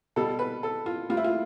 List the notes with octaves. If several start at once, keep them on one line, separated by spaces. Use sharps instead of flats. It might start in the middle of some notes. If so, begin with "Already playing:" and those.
B2 G3 A4
B4
A4
F4
A2 G3 F4
E4
F4